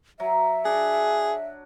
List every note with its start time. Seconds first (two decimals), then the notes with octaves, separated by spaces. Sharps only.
0.20 F#3 E5
0.65 D4 G#4